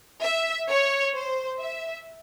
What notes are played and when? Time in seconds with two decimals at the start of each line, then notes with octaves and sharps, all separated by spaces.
0.22 E5
0.68 C#5
1.13 C5
1.59 E5